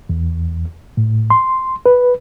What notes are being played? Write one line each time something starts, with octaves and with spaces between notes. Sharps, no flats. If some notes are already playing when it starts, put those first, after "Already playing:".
E2
A2
C6
B4